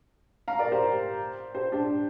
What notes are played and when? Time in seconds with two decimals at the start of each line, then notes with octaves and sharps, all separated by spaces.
0.48 F5 A#5
0.59 A#4 D5
0.72 G4 C5
1.55 G4 C5
1.72 D4 G4